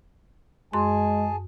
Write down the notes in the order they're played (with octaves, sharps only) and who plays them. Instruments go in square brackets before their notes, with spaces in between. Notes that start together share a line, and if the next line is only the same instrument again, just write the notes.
[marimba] F#2 C6 [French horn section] G#3 [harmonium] G#4 G#5 A5